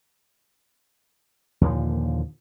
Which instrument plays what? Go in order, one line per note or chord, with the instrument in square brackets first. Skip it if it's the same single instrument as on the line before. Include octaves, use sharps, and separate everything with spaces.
[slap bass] D#2 A#2 D3 F3